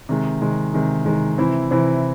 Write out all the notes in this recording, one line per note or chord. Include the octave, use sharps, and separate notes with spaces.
C3 D#3 G#3
C3 D#3 G#3
C3 D#3 G#3
C3 D#3 G#3
C3 E3 C4 E4
C3 E3 C4 E4